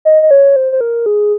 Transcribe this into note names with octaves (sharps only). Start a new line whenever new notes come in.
D#5
D#5
C#5
C5
C5
A#4
G#4